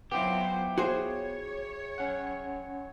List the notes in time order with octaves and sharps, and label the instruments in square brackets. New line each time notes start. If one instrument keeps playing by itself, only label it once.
[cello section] F#3 C5 [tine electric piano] B3 F4 [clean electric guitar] E4 G4
[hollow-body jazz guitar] F#4 G#4 C5 [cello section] C#5
[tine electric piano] C#4 F#5